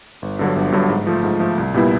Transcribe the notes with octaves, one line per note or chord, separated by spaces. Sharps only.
G1
G2 D3 F#3
G1
G2 D3 F#3
G#2
F3 A3
G#2
F3 A3
C2
A#2 G3 B3 E4